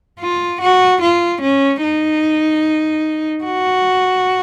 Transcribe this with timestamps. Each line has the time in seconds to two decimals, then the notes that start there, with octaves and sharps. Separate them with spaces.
0.20 F4
0.61 F#4
1.01 F4
1.42 C#4
1.82 D#4
3.44 F#4